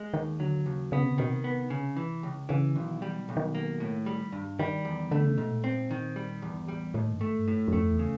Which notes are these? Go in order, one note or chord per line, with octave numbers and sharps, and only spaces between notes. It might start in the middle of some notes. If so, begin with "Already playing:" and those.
Already playing: G#3
D#2 D#3
D3 F#3
D#2 C#3
C#3 B3
C3
C#3
B2 D#3
C3
B3
C#3
E3
C#2
C#3 E3
B1 D#3
E3 G3
D#3
B1
D#3
A#3
A2
G3
G2
D#3 G3
E2
D3 A3
C#3
G#2 B2
A#2
C4
D#3
G3
E2
G2
G#2
A2 G3
D#2 A2
G2
G#2 A3
G2
A2
F#2
F2 A3
E2
C#3